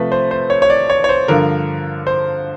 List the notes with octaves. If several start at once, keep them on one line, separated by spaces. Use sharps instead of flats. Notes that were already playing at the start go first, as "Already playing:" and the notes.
Already playing: C3 F3 A3 B4
C5
C5
C#5
C#5
D5
C#5
C#5
C5
G2 D3 F3 A#4
C5